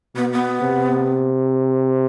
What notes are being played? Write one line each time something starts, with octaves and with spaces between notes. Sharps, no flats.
B2 B3
B3
C3